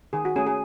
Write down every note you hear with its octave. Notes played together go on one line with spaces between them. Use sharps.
D#3 G#4
F#4
A3 C#4 G#4
G#4